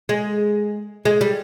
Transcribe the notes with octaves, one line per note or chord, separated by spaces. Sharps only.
G#3
G#3
G3